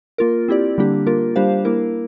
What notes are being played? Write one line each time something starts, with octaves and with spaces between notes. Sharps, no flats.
A#3 F4 A#4
C4 E4 G4 D5
D3 G3 A#3 D4 G4
A#3 F4 A#4
G3 D4 G4 C5 F5
A#3 E4 A#4